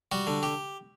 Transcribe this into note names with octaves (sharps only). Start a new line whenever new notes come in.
G3 F#4
D3
G4